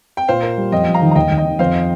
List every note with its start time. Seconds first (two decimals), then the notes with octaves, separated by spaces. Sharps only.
0.17 G5
0.28 A#2 C5 F5
0.43 A#4
0.58 G3
0.72 F2 D#5 G5
0.87 F2
0.94 F5 A#5
1.02 D#3
1.11 A#5
1.15 D#2 D#5 G5
1.30 D#2
1.37 D#5 G5
1.45 D#3
1.59 F2 C5 F5